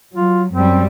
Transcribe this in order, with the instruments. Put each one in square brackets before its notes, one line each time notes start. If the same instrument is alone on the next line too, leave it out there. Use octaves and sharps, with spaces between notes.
[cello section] F#3 [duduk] F4
[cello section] F#2 G3 [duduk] C4